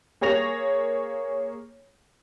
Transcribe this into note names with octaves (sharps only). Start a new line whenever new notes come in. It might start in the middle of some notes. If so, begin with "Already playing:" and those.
A#3 G#4 C#5 A#6 F7